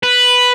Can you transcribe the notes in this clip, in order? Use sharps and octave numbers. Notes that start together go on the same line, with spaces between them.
B4